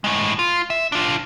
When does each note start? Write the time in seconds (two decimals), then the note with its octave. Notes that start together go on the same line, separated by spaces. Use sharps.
0.04 A2 G#3
0.39 F4
0.70 E5
0.92 D4 F4